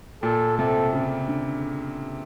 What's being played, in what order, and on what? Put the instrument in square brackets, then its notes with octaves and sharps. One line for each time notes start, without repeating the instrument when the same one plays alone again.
[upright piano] A#2 [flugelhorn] A4
[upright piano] C3 [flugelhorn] A4
[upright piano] C#3
D3